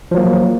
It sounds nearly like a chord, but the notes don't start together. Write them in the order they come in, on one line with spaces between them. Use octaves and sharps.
F3 F#3 A#3